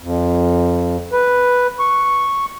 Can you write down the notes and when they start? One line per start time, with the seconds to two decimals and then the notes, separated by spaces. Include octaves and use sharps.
0.02 F2
1.12 B4
1.79 C#6